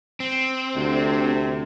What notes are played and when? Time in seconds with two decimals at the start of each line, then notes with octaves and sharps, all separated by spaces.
0.20 C4
0.75 D2 C3